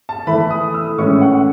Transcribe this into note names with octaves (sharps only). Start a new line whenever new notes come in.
A5
E3 A3 E4 B5
D#6
E6
A2 E3 G#3 C#4 C#6
F#5